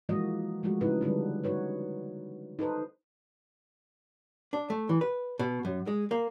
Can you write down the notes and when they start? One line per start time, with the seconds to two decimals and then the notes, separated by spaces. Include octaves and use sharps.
0.09 E3 F3 G#3 A#3 F#4 D#5
0.63 F3 G#3 A3 F#4
0.81 C#3 B3 D#4 E4 B4
1.01 D3 G3 B3 D4
1.44 D#4 F#4 B4 C#5
2.59 D#4 A4 B4 C5
4.53 D4
4.70 A3
4.89 E3
5.01 B4
5.39 B2
5.65 F#2
5.87 G#3
6.11 A#3